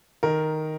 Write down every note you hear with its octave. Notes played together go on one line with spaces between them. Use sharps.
D#3 A#4